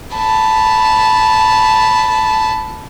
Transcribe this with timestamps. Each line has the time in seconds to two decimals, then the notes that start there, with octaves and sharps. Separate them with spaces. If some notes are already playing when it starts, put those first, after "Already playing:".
0.16 A5 B5